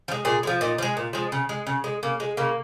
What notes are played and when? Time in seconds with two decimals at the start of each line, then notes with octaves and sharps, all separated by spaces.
0.08 F3
0.11 G#3
0.25 A#2 G#4
0.43 G#3
0.47 F3
0.61 A#2 D#4
0.78 F3
0.82 G#3
0.97 A#2
1.13 F3 G#3
1.32 C#3
1.49 G#3
1.67 C#3
1.84 G#3
2.03 C#3 A#3
2.20 G#3
2.37 C#3 A#3